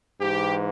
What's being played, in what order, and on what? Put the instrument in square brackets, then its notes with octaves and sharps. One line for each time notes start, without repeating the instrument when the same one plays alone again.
[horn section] G#2 E3 G4